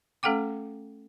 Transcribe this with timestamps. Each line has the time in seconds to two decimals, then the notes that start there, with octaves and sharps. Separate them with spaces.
0.23 A3 C#4 A4 F#5 G5 D6